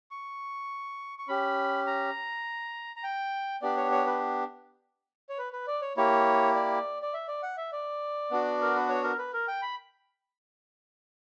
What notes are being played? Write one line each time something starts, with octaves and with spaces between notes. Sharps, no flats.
C#6
C#6
C#4 G4 B5
A#5
A#5
G5
B3 D4 G4 D5
C#5
C#5
B4
C#5
B4
B4
D5
C#5
A#3 E4 G4 C#5
D5
D5
E5
D5
F#5
E5
D5
B3 D4 F#4
A#4
B4
C#5
A#4
B4
A#4
G5
B5